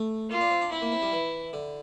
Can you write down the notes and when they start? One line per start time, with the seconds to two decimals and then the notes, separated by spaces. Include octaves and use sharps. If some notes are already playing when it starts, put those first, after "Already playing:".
Already playing: A3
0.30 A#3 F4
0.41 D4
0.51 C4
0.61 D4
0.72 C4 E4
0.82 A#3
0.92 C4
1.02 G3
1.12 E3
1.53 D3